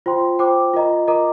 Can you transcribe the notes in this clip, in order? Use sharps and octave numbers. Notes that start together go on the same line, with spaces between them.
F4 C5 G5 C6
F4 C5 G5 D6
F4 A#4 D#5 A#5
F4 A#4 D#5 A#5 D6